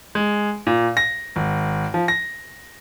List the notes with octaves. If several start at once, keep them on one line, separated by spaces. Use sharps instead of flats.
G#3
A#2
A#6
G#1
F3
A#6